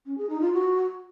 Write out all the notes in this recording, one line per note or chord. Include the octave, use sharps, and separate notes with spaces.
C#4
G#4
D#4
F4
F#4